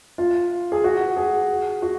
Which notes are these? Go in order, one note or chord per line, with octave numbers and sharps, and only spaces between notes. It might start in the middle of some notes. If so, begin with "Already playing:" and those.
F4
G#4
F#4
G#4
F#4